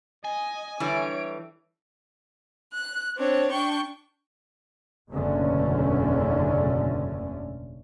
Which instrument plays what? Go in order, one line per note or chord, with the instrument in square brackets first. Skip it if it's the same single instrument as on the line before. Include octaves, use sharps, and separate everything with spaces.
[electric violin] D#5 [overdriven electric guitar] G#5
[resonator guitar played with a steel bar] D3 E3 G3 [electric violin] C#5 D7
[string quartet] F#6
C4 D4 C#5
D4 G5 C#6
[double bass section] F#1 E2 B2 D3 A3 C#4